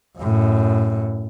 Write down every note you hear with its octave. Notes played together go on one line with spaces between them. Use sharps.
F#2 A2